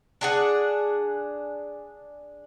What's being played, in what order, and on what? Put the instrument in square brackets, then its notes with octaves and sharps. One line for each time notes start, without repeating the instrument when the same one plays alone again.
[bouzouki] D4 G#4 F#5